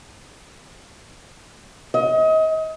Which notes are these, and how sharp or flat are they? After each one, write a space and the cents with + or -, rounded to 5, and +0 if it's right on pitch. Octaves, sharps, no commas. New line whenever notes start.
D#5 +30